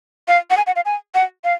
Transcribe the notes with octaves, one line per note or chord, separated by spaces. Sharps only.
F5
F#5
G#5
F#5
F5
G#5
F#5
F5